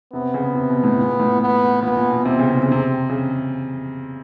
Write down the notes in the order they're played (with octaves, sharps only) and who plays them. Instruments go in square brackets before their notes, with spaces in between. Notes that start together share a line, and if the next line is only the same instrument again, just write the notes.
[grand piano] C3 [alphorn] B3
[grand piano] C#3
C3
B2
A2
A#2
A2
[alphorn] B3
[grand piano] A#2 [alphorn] B3
[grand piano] A#2
B2
[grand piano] C3 [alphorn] C4
[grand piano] C#3
C3
C#3
C3
C#3